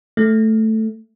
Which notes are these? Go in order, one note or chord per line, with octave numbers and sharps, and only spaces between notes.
A3